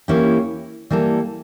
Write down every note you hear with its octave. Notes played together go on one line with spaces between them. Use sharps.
E3 A#3 C#4 E4 G4
E3 G3 A#3 E4 A4